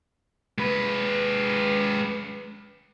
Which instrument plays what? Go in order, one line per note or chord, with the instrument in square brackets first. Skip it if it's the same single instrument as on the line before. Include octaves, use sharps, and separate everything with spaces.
[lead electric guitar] G#3 B4